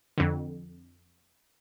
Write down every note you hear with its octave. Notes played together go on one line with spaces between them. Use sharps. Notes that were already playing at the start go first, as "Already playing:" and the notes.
F2 D3